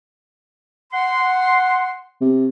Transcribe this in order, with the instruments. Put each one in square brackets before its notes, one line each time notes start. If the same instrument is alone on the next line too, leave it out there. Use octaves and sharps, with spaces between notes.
[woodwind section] F#5 C6
[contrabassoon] C3